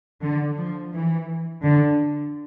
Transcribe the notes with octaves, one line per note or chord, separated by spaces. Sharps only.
D3
F3
E3
D3